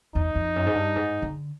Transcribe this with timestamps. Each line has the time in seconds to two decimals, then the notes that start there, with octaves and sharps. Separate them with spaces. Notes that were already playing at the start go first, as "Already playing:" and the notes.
0.15 E2 D#4
0.35 F2
0.56 F#2
0.66 G#2
0.75 G2
0.96 G#2
1.22 D3